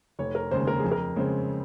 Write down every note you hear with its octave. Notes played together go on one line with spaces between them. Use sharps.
F1 C#5
A#4
D#2 C#3 G#3 C5
A#4
F2 G#4
A#4
C#3 G#3 C4